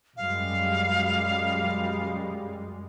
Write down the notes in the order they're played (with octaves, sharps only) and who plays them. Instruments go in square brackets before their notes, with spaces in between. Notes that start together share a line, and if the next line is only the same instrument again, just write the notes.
[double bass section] F#2 G3 G#3 [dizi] F5